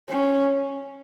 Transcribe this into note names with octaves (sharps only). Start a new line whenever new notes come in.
C#4